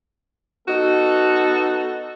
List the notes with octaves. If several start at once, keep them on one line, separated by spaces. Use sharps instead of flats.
B3 D#4 F#4 A4